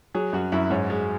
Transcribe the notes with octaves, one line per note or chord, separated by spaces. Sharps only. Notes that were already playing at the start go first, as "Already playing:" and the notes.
F#3 G#4
F#2 F#4
F#2 E4
G#2 C#4
G#3